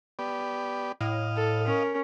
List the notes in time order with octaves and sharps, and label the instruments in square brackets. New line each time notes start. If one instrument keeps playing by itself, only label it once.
[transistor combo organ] B3 G4 D5
[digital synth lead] A2 [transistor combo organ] D#5 F5
[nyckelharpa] A4
C#4 A#4